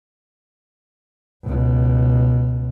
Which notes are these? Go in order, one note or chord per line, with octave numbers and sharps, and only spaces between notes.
C#2 B2